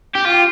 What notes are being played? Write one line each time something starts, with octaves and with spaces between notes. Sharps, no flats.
G4
F4